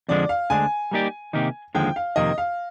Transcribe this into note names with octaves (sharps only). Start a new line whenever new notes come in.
F2 D3 F3 G#3 D4 D5
F5
D2 D3 G#3 D4 G#5
G3 A#3 D#4 G4 D5
C3 D#3 A#3 D#4 G4
D#2 D3 F3 G#3 G5
F5
F2 C3 D#3 A#3 D#5
F5